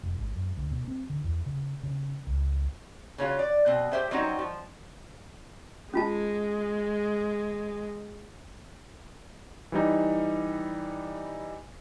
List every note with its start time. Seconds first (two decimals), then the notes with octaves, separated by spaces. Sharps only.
0.03 F1
0.19 G#1
0.35 F#2
0.57 D2
0.71 B2
0.88 C4
1.10 D3
1.24 E2
1.46 C#3
1.83 C#3
2.27 C#2
3.18 C#3 C#4 F4 F#4
3.39 D5
3.66 B2 C4
3.92 G4 G#4 C5 E5 G5
4.11 F#3 G3 C4 C#4 D#4 F#4
4.39 F3
5.94 G#3 C#4 F4 A5
9.72 E3 G3 D#4